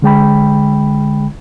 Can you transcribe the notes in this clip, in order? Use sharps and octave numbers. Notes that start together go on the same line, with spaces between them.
D3 G#3 G5 B5